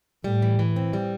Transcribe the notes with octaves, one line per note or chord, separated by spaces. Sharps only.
A2 G3
E3
E3
C4
G3